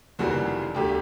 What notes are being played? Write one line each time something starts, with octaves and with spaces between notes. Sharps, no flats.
F1 D#2 C#3 E3 G3 F#4
E1 D2 D3 G4